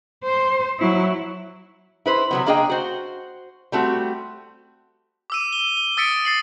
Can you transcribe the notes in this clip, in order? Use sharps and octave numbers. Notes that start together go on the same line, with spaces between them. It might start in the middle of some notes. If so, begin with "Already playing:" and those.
C5
F#3 E4
E4 B4 C5
C3 F#3 B3
A#3 D4 G#4 D#5 G5
F#4 C5
G3 A3 C4 F#4
D6 E6 D#7
G7
G7
D#6 E6 A6 B6 C#7 D7
A6 C7 F#7